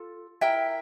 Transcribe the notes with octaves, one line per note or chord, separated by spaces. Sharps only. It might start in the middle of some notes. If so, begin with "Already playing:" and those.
Already playing: F4 A4
E4 A#4 E5 G5